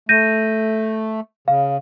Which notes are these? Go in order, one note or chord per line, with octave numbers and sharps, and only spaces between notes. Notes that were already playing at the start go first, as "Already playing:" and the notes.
A3 G6 A#6 D#7
C#3 F5